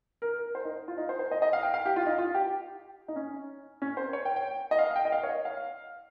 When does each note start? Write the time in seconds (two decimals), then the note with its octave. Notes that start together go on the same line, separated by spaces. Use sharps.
0.22 A#4
0.38 A#4
0.55 C5
0.65 D#4
0.88 F4
0.98 D#4
1.09 C5
1.19 C5
1.31 D#5
1.42 D#5
1.53 F5
1.63 G5
1.74 F5
1.86 G4
1.96 F4
2.06 D#4
2.18 F4
2.34 G4
3.08 D#4
3.16 C#4
3.82 C#4
3.97 C5
4.13 C#5
4.25 G5
4.36 G5
4.71 D#5
4.79 F5
4.96 G5
5.05 D#5
5.12 F5
5.23 C#5
5.29 D#5
5.45 F5